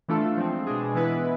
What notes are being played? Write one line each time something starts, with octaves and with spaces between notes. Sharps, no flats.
E3 A3 D4 F4 A4
F3 G#3 C4
B2 G#3 D4 G#4
E3 G#3 B3 E4 B4